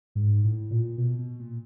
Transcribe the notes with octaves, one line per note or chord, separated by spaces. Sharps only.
G#2
A2
A#2
B2
B2
A#2